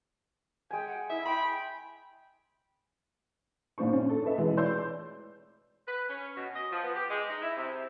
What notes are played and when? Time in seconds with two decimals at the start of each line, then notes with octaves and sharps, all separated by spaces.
0.71 G#3 G5 G#5
0.87 F#5
1.10 E4 D#5 E5
1.25 G5 B5 C6
3.78 G#1 A#2 F3 D4 C5 C#6
3.93 C#4
4.10 A4
4.24 A4 B4 D#5 E5
4.38 B2 E3 G#3 B3 E4
4.57 C#5 D5 C6 E6 G6
5.88 B4
6.09 C#4
6.37 B2
6.55 D#5
6.71 F3
6.83 B3
6.96 G4
7.10 G#3
7.30 D#4
7.42 E4
7.57 C3